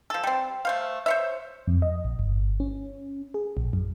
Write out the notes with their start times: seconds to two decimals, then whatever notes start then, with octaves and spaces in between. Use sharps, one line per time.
0.10 F3 A4
0.23 G3 C4
0.65 A3 C5 F5
1.06 C5 C#5 E5
1.67 F2
1.82 D#5
2.05 A#1
2.19 G1
2.60 C#4
3.34 G#4
3.57 A#1
3.73 F#2